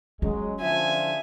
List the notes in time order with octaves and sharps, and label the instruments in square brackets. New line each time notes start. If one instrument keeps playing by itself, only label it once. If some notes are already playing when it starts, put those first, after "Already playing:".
[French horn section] F#3 G#3 [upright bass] C#4
[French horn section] D3 F3 [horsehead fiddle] E5 [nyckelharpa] G#5